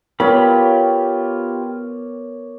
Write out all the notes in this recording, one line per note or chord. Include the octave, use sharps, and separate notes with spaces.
B3 F4 G4 A#4 C#5 D5 B5